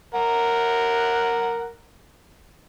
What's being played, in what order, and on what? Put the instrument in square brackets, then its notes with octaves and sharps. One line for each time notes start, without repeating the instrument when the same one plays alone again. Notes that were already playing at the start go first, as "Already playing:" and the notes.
[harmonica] A#4 F#5